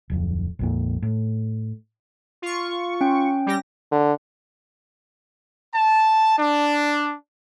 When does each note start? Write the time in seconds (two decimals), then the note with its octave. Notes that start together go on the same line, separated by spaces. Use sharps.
0.10 D1 F2
0.59 A#1 F2 A#2
1.02 A2
2.42 F4 C#6
3.01 C#4 G5
3.46 G3 G4 A#6
3.91 D3
5.74 A5
6.39 D4